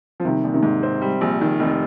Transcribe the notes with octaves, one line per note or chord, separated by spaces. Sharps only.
F3
C3 D#3 G3
A#1
C3 D#3
G#2
C4
G3
A#1
D#3
F1